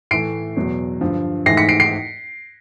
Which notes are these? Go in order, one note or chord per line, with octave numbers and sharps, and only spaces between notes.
A2 E3 A3 C7 D7
E2 B2 F#3
G2 D3 F3
G#2 E3 A3 A#6 C7
B6 C#7
C7 D7
C7 D7